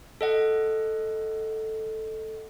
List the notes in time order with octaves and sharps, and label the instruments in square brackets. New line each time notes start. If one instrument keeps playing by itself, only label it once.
[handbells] A4 D#5 F#5